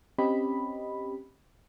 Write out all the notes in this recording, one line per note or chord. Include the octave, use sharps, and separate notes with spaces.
C4 C#4 G4 D#5 B5